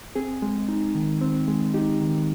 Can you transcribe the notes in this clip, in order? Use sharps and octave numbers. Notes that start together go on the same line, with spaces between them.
C4 G#4
G#3
D#4
D#3
C4
G#3
D#4 G4
D#3